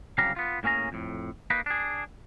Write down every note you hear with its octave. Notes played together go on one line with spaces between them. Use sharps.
C2 C#3 F#3 G4 F5 A#5
B3 F4
A2 A#3 C#4 G#4 A#5
F2 A2
A#3 D#4 B4
D4 G#4